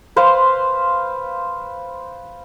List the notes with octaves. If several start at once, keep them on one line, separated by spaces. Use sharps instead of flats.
B4 C5 F5 C6